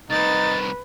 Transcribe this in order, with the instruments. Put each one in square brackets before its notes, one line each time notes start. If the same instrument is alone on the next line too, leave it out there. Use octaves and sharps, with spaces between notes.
[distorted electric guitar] C2 D#3 [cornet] D#4 [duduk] B4 [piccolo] A6